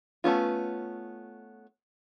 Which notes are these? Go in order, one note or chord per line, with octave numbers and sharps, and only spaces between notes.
A3 B3 C#4 F4